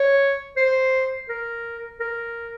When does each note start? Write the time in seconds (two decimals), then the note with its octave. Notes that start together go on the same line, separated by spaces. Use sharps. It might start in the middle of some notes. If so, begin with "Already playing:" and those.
Already playing: C#5
0.57 C5
1.29 A#4
2.00 A#4